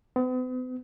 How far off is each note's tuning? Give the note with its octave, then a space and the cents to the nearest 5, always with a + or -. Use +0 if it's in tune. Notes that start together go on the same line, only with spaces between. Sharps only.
B3 +45